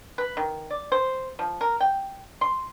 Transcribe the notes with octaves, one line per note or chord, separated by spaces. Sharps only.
B4
D#3
D5
C5
F3
A#4
G5
C6